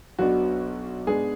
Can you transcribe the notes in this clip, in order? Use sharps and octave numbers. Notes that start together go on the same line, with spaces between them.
B1 B2 F#3 B3 D4 F#4
G#2 G#3 B3 D4 G#4